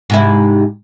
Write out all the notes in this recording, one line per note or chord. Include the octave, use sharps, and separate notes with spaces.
G#2 C3 E4